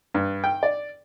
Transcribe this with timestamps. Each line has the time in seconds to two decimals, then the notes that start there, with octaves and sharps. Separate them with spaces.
0.14 G2
0.44 G5
0.63 D5